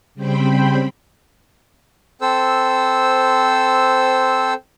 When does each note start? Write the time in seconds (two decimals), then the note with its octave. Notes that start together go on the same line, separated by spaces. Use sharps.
0.15 C#3 G3 C4 C5 G5 B5
2.21 C4 A4 C5 E6